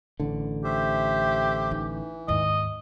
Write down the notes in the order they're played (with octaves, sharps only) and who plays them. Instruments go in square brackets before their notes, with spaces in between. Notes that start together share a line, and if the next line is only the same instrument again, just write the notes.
[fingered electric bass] A1 D3
[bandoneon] A3 C5 E5 [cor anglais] G4
[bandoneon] E3 [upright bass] D#4
[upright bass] D#2 G#2 [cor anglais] D#5